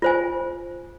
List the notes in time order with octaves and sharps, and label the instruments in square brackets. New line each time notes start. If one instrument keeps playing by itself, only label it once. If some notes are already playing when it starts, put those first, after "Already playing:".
[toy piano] F4 C5 G#5